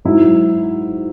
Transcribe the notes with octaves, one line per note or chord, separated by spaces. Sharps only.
G#2 F#3 E4